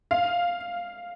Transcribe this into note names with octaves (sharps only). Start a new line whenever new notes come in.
F5